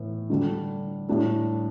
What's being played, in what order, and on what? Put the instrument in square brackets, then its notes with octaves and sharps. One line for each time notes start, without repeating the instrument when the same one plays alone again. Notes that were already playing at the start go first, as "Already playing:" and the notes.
Already playing: [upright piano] A2 E3 B3 E4
D3 G3 D4 A4
A2 G3 D4 A4